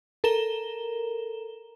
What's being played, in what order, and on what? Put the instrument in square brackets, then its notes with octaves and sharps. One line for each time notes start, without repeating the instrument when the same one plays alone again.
[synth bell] A4 A#4 A#5 E7 G7